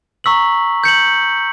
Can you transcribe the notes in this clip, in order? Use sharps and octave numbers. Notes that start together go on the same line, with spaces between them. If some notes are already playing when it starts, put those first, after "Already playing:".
A#5 C#6 E6 B6 F#7
G6 C#7 F#7